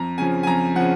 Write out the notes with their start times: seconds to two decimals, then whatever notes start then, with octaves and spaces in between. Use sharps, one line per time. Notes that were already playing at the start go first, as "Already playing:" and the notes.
Already playing: F2 A#5
0.18 C#3 F3 G#5
0.43 G#5
0.47 F2 A#5
0.76 C#3 F3 F#5